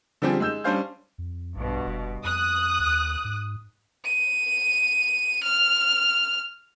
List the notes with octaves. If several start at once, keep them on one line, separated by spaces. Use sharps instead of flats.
D3 F3 G3 C4 G4 G#4
G#3 D#4 E6 G6 E7
G3 C#4 D4 C5 F5 G6
F2
A#1 G2 B2
F1
F2 D#6 F#6
D#2
G#2
D#7
F6